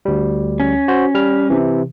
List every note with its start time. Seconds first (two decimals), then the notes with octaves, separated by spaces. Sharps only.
0.05 D2 G3
0.60 C#4
0.88 F#4 C5
1.14 G3 F6
1.50 C3 E3